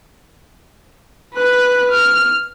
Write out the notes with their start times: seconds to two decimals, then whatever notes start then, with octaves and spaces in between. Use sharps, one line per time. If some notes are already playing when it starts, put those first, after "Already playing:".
1.34 B4 F#6
1.91 F6